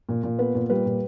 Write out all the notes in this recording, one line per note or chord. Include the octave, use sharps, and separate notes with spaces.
A#2
A#2
B3 B4
A#2
G3 B4
A#2